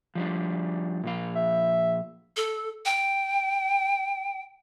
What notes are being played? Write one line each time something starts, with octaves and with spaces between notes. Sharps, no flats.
F3 G3 D4
A#2 F3 F5
E5
A4
G5